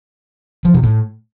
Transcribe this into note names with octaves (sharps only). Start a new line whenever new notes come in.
F3
C3
A2